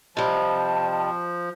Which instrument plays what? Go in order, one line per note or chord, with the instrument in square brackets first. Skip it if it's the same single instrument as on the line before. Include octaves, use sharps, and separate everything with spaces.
[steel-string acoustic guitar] C3 G3 [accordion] F3 [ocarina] D#5 [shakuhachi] A5